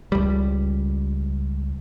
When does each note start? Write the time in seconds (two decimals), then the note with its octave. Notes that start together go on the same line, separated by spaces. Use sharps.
0.12 C#2 G3